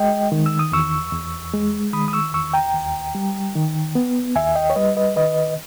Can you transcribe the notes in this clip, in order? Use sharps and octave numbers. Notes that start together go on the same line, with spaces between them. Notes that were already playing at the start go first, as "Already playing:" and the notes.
Already playing: G#3 D#5 G5
D#3
E6
D#6
E2 C#6 E6
E2
G#3
D#3 B5 D#6
D#6
C#6 E6
E2 C#6 E6
G5 A#5
D#2
G3
D#3
B3
D#2 E5 G#5
D#5 G5
C#5
G3 B4 D#5
B4 D#5
D#3 B4 D#5